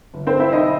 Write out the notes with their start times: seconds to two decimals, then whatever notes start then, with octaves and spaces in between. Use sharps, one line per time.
0.14 G1
0.27 C4 C5
0.34 G2
0.39 E4 E5
0.51 B1 D#4 D#5